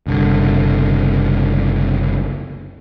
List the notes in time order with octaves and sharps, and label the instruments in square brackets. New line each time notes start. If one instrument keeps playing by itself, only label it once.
[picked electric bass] F#1 C2 D3